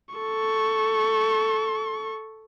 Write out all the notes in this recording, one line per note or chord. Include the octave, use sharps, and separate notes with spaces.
A4 C#6